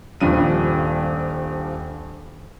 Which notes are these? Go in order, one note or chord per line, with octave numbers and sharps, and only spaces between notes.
D#1 G2 F3 D#7